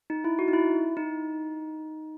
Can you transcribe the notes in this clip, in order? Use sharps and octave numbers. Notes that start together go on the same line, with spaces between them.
D#4
E4
F#4
D#4
E4
D#4